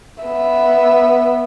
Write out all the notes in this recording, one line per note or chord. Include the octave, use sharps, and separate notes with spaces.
B3 E5